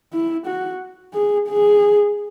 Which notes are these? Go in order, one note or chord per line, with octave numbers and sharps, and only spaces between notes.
E4
F#4
G#4
G#4